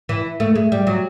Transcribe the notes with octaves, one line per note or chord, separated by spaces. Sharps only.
E3
A3
G#3
G3
F#3